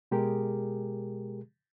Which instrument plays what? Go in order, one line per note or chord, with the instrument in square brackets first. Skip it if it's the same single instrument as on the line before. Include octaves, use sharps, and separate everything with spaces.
[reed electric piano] B2 G#3 G4 G#4 A#4